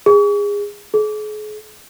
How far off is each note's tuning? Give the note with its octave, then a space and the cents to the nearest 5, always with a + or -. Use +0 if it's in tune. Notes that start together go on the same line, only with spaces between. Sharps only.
G#4 -25
G#4 +40